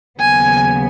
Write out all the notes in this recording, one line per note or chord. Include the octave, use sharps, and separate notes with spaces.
D#2 C#3 F#3 B3 G#5